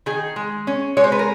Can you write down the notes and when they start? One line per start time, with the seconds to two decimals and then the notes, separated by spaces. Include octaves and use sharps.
0.06 D#3 G#4
0.36 G#3
0.67 C#4
0.97 G#3 C#5
1.04 C5
1.12 B4
1.19 A#4